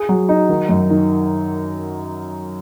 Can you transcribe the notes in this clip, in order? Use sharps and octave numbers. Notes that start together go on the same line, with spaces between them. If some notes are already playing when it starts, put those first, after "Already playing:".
Already playing: G#4
F#3
D#4
D#3
F#2
D#3